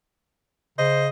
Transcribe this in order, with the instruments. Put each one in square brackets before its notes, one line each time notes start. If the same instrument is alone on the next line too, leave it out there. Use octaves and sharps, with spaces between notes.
[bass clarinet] C#3 [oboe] C5 [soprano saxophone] D#5